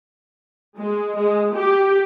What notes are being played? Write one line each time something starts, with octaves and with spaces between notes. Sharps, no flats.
G#3
G#3
G4